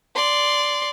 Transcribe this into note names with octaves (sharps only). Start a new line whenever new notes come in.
D5 C6